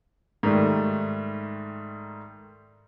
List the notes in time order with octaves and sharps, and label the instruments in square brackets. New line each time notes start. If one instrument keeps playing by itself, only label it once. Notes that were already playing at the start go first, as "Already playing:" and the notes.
[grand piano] G#2 D#3 G3 A3